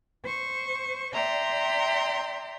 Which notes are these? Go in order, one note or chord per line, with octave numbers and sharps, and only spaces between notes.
C5 C#6
D5 E5 G5 A#5 C6